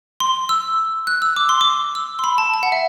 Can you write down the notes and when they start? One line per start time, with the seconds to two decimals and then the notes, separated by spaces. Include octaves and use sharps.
0.20 C6
0.49 E6
1.07 F#6
1.22 E6
1.36 D6
1.49 C6
1.61 D6
1.95 E6
2.19 C6
2.24 B5
2.38 A5
2.54 A5
2.63 F#5
2.72 E5